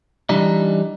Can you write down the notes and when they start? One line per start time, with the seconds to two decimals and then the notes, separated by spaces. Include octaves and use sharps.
0.29 E3 G3 D4 D#4